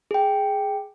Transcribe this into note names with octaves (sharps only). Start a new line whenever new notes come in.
G#4 G5